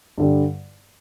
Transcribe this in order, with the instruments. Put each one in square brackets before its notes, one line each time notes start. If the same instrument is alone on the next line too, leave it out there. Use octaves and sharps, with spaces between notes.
[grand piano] G2 D3 G3